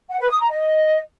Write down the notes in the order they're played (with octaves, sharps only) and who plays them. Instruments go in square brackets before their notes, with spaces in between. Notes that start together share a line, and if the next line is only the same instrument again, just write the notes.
[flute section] F#5
B4
D#6
A#5
D#5